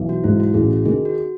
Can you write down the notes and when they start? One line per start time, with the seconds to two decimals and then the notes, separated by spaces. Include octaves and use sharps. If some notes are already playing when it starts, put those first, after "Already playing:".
Already playing: B1 E3
0.09 F#4
0.24 G#2 E4
0.40 F#4
0.54 A1 G#4
0.70 F#4
0.85 D#3 G#4
1.05 F#4